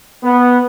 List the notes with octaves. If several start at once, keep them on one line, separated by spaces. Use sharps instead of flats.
B3